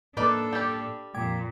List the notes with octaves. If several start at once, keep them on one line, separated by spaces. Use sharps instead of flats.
A2 A#3 D4 D#4 A4 B4 D5
G3 G4
F2 A#2 G5 D6 G#6